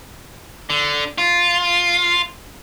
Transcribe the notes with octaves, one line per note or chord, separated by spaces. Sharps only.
D3
F4